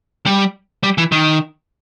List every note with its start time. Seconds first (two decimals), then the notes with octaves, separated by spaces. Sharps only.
0.26 G3
0.83 G3
0.98 E3
1.12 D#3